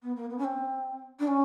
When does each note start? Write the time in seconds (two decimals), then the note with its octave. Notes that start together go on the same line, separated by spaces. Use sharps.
0.02 B3
0.15 A#3
0.29 B3
0.38 C#4
0.44 C4
1.19 D4
1.27 C#4